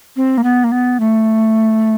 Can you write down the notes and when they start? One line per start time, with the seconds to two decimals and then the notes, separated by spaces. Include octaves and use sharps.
0.16 C4
0.37 A#3
0.43 B3
0.64 A#3
0.72 B3
1.00 A3